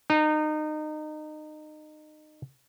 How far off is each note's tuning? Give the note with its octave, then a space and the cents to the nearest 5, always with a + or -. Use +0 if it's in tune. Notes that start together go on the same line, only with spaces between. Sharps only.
D#4 -25